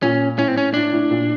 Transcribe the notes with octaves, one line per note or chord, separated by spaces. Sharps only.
A#2 C#4
A2 C#4
C4
C#4
A2 D4
A2
A#2